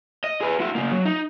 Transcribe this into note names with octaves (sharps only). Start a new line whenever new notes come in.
D#5
G#4 B4
E4 F#4
C#3 A#3
F#3
D#4